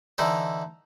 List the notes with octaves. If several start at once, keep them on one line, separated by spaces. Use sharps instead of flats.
D3 E3 D#4 C5